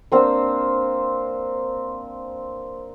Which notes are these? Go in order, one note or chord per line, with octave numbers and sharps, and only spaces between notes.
A#3 C4 D4 C5